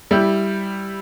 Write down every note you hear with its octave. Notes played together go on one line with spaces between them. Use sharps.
G3 E4 G4